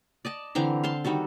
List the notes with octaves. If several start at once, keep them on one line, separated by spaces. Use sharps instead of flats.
D5 D#5 A5
D3 E3 C4 A#5
F5 A5 C6
D#3 G3 F#4 A4